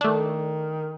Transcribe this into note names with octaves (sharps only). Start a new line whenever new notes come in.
D#3 A3 D4